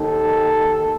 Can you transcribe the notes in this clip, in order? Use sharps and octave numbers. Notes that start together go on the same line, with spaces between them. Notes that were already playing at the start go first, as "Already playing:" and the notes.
Already playing: D#2 D#3 A4